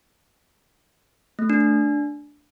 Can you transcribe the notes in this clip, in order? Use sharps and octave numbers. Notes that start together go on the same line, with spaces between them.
A3
D4
D4